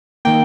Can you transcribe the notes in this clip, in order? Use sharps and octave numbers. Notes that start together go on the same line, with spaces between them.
D#3 A#3 G5